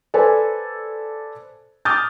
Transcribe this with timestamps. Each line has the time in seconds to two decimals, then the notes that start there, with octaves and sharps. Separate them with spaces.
0.14 A4 B4 C5 D5 G#5
1.85 D6 D#6 F6 G6 A6